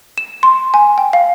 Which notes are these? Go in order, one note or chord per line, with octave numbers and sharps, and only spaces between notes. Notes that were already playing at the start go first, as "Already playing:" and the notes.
E7
C6
G#5
G5
F5